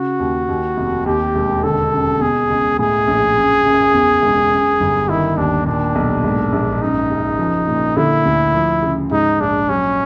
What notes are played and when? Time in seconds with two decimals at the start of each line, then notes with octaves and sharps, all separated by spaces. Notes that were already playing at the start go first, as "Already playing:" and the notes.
Already playing: C#3 F#4
0.20 D#2
0.49 D#2
0.77 F1
1.06 D#2 G4
1.35 E1
1.63 D3 A4
1.92 F#2
2.21 B2 G#4
2.50 C#2
2.79 A2 G#4
3.07 A#1
3.37 F#2
3.65 F#1
3.94 E2
4.22 E1
4.51 F#2
4.80 G1
5.09 D#3 E4
5.37 D#2 D4
5.66 A#2 D4
5.95 B1
6.24 G#2
6.52 A#1
6.82 F#2 D#4
7.11 F#1
7.39 F3
7.68 A#2
7.96 D3 E4
8.25 D2
8.54 F3
8.82 C#3
9.11 G#2 D#4
9.40 A#1 D4
9.69 F#3 C#4